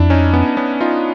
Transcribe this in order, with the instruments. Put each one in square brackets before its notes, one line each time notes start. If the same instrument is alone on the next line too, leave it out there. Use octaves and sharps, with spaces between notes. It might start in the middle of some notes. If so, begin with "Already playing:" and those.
Already playing: [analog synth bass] F2 [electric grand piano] D4 E4
[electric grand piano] C#4 D#4
B3 C#4
B3 C#4
D#4 F4